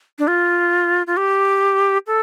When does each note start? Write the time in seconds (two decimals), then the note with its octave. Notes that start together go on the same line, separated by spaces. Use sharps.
0.19 D4
0.28 F4
1.07 F4
1.17 G4
2.07 A4